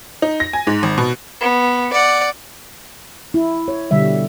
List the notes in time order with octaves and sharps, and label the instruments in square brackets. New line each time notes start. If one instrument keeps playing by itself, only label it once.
[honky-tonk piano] D#4
A#6
G#5
G#2
G#1
B2
[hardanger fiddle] B3
D5 F#5
[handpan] E4
C#5
B2 D3 G3 E5